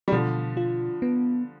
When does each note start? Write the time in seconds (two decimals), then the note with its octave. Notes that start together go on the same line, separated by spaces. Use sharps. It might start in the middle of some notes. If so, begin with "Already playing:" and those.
0.08 G3
0.12 B2 D3 F3
0.57 F4
1.02 B3